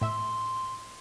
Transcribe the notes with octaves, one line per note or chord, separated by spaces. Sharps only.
A2 E5 C6